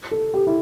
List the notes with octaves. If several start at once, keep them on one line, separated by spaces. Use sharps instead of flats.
A4
G4
E4